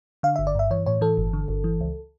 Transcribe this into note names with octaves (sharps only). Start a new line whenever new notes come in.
D3 F5
G1 E5
D5
G2 E5
E3 C#5
A2 C#5
E3 A4
G1
D3
G1
E3
C#2